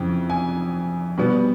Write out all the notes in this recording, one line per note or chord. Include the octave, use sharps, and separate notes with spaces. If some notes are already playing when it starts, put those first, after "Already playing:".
Already playing: F2 C#3 E3
G#5
B2 G3 B3